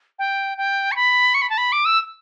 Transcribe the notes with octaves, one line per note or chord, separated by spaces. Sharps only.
G5
G5
C#6
B5
C#6
B5
A5
B5
D6
E6